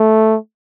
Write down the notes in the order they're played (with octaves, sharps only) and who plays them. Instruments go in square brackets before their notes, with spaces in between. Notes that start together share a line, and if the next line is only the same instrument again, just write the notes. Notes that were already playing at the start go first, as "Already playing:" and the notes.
Already playing: [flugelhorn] A3